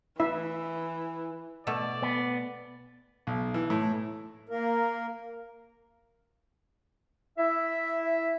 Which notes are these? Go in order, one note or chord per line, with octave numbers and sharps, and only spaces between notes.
E3 E4 E5
B2 A3 D5
B3
B1
E3
A2
A#3 A#4
E4 E5